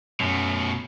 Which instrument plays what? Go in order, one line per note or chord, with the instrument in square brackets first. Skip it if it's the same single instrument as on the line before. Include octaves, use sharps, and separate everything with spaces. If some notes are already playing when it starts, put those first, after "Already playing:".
[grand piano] F#2 [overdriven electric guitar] B2 A3